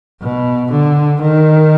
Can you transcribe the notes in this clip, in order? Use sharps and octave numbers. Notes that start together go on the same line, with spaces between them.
B2
D3
D#3